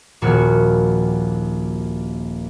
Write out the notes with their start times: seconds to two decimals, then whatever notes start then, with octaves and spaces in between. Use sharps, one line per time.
0.21 D#1 A#1 A#2 F#4 C#6 F6